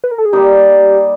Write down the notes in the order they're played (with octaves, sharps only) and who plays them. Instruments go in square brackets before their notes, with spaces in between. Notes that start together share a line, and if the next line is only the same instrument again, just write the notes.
[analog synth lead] B4
A#4
A4
G#4
[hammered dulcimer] G3 A#3 D#4 [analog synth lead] G4